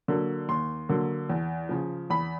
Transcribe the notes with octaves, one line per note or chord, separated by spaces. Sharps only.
D3 F#3 A#3
D#2 C6
D3 F#3 A#3
E2
C#3 F3
E2 B5